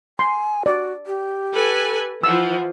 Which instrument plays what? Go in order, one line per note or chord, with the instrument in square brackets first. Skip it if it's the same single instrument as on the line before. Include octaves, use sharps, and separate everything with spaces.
[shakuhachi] G#5 [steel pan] C6
[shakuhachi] F#4 [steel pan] D5
[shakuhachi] G4
[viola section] A4 B4 G#5
[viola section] E3 F3 [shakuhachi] F#5 [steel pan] E6